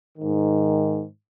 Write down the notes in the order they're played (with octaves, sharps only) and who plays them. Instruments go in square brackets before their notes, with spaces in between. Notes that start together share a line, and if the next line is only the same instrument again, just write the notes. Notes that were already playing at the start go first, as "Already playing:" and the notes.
[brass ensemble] G#2 D#3